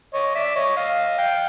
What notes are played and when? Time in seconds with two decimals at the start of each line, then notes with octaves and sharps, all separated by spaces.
0.14 C#5 D#5
0.35 D5 E5
0.56 C#5 D#5
0.77 D#5 F5
1.18 F5 G5